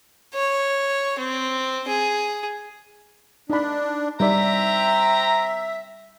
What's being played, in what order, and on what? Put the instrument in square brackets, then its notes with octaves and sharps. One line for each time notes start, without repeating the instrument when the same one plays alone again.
[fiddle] C#5
C4
G#4
[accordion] D4 [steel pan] D#4 B5
[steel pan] G3 D#4 D5 [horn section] C4 G5 A#5 [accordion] E5